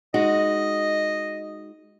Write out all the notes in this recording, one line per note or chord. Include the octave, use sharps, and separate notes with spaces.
G#3 D#4 F#4 D#5